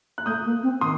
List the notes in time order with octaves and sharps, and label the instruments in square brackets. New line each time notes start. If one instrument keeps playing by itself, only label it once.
[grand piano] F#6
[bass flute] A3 [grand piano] D#6 G6
[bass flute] A#3
C4
[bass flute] D#3 [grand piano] C6 D#6